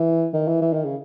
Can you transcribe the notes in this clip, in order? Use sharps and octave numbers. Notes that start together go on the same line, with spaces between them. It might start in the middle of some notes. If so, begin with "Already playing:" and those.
Already playing: E3
D#3
E3
E3
D#3
C#3